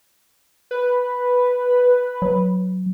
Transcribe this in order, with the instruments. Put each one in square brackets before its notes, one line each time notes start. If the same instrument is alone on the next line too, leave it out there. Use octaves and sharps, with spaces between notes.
[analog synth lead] B4
[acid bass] F#3